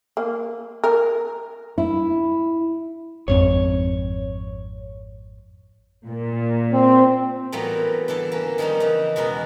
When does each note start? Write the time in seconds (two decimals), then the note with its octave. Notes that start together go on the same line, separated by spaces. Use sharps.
0.17 A#3
0.84 A#4
1.78 E4
3.28 G#1 F2 C4 C#5
6.07 A#2
6.72 C4
7.52 A2 E3 F#3 G3 A#3 B3
8.08 D3 E3 D4 A5
8.32 A#3 C#4
8.58 D#3 F3 G3 D4 D#4
8.80 C#3 E3
9.16 E2 B2 G#3 F#4 A#4